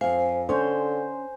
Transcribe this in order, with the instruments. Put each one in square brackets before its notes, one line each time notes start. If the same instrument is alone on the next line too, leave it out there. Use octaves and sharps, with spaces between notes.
[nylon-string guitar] F2 F5 [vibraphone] C5 G#5
[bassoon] D3 [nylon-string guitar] C#4 C#5 [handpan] C5 [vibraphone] G#5